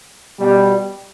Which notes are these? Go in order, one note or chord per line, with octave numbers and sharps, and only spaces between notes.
B2 G3